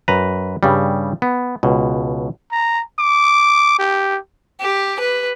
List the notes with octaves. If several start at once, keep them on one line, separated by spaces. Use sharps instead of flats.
F#2 B4 A#5
G2 C#3 G3
B3
C#2 B2
A#5
D6
G4
G4
B4